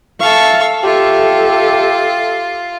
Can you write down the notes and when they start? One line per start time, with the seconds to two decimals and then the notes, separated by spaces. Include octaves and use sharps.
0.20 A4 E5 F5 C#6
0.83 F4 G4 A4 E5